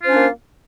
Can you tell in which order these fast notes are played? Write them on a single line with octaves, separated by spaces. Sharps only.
F4 C5 C#4 D4 A#3